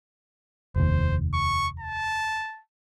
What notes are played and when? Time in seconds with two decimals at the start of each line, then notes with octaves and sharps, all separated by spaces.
0.76 F1 D#2 C5
1.34 C#6
1.80 A5